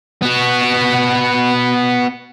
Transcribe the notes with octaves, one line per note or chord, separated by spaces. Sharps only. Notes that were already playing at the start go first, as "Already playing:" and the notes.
B3 F#4